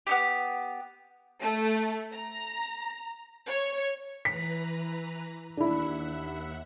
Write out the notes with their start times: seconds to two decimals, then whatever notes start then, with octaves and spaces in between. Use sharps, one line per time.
0.07 B3 D#4 G4
1.41 A3
2.12 A#5
3.47 C#5
4.25 E3 B4 A#5 B6
5.57 D#2 D4 E4 E5 F#5